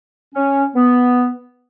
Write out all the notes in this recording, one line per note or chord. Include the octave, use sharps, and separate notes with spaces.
C#4
B3